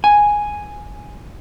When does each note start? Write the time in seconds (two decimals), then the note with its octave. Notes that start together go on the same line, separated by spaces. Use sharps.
0.04 G#5